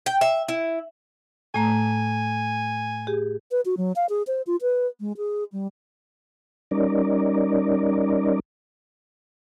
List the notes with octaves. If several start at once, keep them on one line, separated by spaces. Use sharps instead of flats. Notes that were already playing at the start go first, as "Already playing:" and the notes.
G5
E5
E4
A2 A3 G#5 A#5
G4 G#4
B4
F#4
F#3
F5
G#4
C5
F4
B4
G#3
G#4
G3
G3 C#4 D#4 A#4 D5